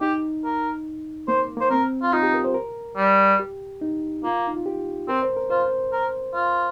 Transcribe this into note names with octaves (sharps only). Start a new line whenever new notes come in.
D#4 G4
A#4
A#3 C5
A#3 C5
C4 A#4
F4
D#4 F4
G4
A#4
C5
A#4
G3
G4
D#4
A#3 F4
D#4
F4
G4
C4 A#4
C5
A#4
F4 C5
A#4
F4